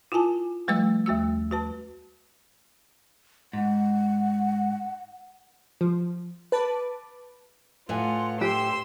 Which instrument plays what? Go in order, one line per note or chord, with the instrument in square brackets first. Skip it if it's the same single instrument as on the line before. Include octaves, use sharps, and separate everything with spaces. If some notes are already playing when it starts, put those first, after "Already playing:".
[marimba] E4 F4 A#4 G#5 A5
F3 G3 A3 B4 E6
D#2 A3 F#4 E6
F#4 B4 A5
[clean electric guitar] G#2 [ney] F#5
[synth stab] F3
B4 A5 D6
[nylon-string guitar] A2 B4 G#5 [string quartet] F4 F#5
[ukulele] G4 [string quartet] C6 E6